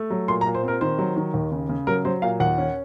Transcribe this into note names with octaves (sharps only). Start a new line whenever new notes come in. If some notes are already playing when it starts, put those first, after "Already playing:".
Already playing: A3
F#3
A#2 C6
A#5
A#2
C5
C4 A#4
D#3 C5
F#3
D#3
D#2
C#3
C#3
F#3 A#4
F#3 C5
A#2 F5
D#2 F#5
C#4